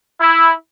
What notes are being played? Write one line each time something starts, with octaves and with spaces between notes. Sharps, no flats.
E4